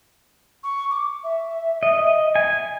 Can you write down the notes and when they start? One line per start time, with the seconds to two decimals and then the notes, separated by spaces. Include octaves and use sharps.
0.63 C#6
0.90 D6
1.24 E5
1.83 D#5
2.35 G#5